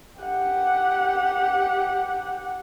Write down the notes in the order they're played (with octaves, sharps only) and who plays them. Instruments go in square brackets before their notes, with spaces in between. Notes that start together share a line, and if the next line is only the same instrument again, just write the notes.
[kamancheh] G4 F#5